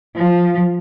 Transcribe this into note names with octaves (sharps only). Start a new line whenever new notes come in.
F3